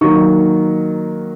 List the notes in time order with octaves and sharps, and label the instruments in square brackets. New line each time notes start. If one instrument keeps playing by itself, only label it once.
[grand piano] D#3 F#3 A#3 C#6